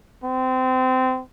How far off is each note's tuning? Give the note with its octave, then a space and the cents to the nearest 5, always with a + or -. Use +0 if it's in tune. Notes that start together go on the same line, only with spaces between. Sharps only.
C4 -25